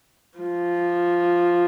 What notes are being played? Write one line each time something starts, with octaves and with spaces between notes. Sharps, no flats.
F3